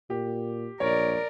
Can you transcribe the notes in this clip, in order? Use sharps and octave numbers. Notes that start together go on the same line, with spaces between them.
A#2 G4
A#1 A#4 C#5 D5